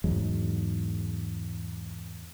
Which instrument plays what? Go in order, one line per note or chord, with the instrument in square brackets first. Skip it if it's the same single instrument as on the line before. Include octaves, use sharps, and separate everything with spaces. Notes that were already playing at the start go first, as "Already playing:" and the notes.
[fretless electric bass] E2 G#2 F#3 G#3